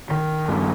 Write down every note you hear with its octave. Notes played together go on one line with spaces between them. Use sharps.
D#3
G2